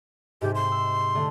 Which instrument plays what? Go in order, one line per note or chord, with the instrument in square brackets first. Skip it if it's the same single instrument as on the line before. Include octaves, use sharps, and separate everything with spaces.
[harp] G#2 C3 [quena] G4
[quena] C6
[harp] E6
D3 A3